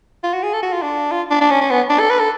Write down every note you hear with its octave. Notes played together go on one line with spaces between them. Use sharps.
F4
F#4
G#4
A4
F#4
F4
D4
F4
D4
D4
C#4
C#4
B3
D4
A4
B4
A4